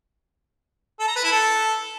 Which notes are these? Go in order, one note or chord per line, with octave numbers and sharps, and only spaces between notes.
A4
A#5
B4
E4
A4